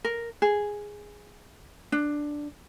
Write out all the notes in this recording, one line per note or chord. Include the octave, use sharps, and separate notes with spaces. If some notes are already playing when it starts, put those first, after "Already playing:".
A#4
G#4
D4